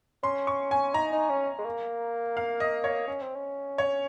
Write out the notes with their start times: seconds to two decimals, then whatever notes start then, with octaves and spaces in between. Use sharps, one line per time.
0.23 C#4 C6
0.47 C#6
0.71 G#5
0.94 D#4 A#5
1.13 D#4
1.30 C#4
1.58 G#3
1.65 A#3
2.37 F5
2.60 D#5
2.84 C#5
3.08 C#4
3.22 C4
3.35 C#4
3.78 C#5